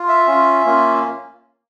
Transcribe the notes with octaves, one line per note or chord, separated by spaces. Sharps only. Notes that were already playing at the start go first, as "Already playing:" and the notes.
Already playing: F4
E5
C#4 F4
A#3 C#4 F4